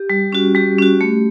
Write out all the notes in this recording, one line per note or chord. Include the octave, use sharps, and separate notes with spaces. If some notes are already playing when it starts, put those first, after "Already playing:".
Already playing: G4
G3
C#4 F#4
G3 G4
C#4 F#4
A3